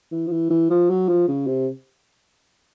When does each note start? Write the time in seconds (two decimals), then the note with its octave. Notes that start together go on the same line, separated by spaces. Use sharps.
0.12 E3
0.27 F3
0.31 E3
0.50 E3
0.70 F3
0.90 F#3
1.08 F3
1.28 C#3
1.47 C3